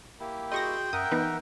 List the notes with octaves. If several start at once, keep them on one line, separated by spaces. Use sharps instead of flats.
A#3 E4 G4
F#4 G#4 D#5 G5 C6 C#6 A#6
F#2 A#4 E5 F#5 D#6
E3 B3 D#4 B4